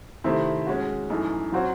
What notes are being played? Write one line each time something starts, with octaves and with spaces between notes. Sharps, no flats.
C3 D#3 A3 C4 E4
G#3 C#4 F#4
F#2 E3 A3 D#4
F#3 C4 F#4 C#5